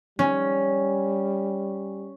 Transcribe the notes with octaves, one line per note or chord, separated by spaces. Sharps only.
G3 C#4